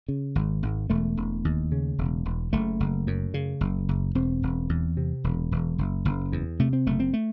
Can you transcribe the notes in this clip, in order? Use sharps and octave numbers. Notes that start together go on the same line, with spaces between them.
C#3
G#1
G#1
E1 A3
E1
D#2
C#3
E1
E1
F#1 A3
F#1
F#2
C#3
F#1
F#1
E1 C4
E1
E2
C3
E1
E1
F#1
F#1
E2
C3 A3
C4
F#1 A3
C4
A3